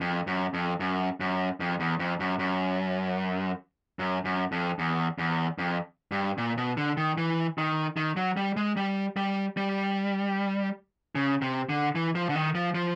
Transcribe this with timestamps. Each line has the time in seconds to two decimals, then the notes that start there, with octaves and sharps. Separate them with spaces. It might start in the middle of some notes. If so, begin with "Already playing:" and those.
0.01 F2
0.27 F#2
0.54 F2
0.80 F#2
1.20 F#2
1.60 F2
1.80 E2
1.99 F2
2.20 F#2
2.39 F#2
3.99 F#2
4.25 F#2
4.52 F2
4.79 E2
5.18 E2
5.58 F2
6.12 G2
6.38 A#2
6.57 B2
6.77 D3
6.97 D#3
7.18 E3
7.58 D#3
7.97 D#3
8.16 F#3
8.37 G3
8.57 G#3
8.77 G3
9.17 G3
9.57 G3
11.15 C#3
11.42 C3
11.69 D3
11.95 E3
12.15 F3
12.29 D3
12.36 D#3
12.55 F3
12.75 F3